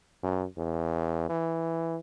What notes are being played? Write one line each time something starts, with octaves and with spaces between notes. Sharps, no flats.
F#2
E2
E3